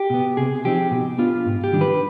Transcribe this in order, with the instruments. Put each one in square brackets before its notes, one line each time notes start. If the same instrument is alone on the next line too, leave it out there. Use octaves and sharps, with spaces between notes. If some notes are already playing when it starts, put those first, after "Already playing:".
Already playing: [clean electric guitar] G4
B2 B3
C3 G#4
F3 C4 D#4 G4
B2
B3 D4 F4
G#2
G4
D#3 G3 D4
B4